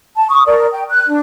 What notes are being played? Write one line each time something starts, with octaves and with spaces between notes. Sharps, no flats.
A5
C#6 D#6
A#4 D5
G5
F#6
D4